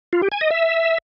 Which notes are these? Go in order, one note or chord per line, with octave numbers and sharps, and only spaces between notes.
F4
G4
G#5
D#5
E5